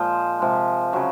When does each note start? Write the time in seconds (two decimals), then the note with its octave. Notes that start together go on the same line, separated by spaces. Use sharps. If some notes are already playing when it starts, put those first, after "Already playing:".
Already playing: A#2 F3 G#3 C5 D#5
0.39 C3 F3 G#3
0.93 C#3 F#3